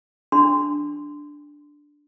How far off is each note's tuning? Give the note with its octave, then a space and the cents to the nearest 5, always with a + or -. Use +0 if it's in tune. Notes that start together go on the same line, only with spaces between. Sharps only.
D4 +0 C6 -20